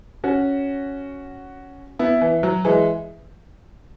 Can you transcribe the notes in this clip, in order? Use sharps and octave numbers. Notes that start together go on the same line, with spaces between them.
C#4 F#4
B3 E4
E3
F#3
E3 G#3